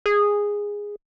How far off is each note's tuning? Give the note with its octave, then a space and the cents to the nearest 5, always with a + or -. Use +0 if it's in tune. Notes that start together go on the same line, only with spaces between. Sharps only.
G#4 -10